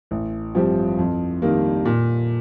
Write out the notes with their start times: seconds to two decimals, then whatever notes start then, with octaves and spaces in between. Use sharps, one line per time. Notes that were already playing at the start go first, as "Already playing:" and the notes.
0.11 A1
0.55 G2 F3 C4 G4
0.99 F2
1.42 D#3 G3 A#3
1.85 A#2